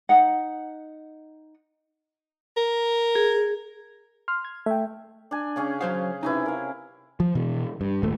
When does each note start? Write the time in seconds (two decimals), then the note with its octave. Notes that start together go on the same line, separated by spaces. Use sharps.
0.09 D#4 F#5
2.57 A#4
3.15 G#4
4.28 C6 F6
4.45 G#6
4.66 A3 E5 G5
5.31 D4 G#5
5.56 C#3 C#4 G#4
5.81 F#3 G#4 C5 F5
6.23 C3 C#4 D#4 E4 B4
6.46 A#4 F5
7.20 F3
7.35 B2 E3
7.81 G2
8.03 D#1 G#1 A#2 A3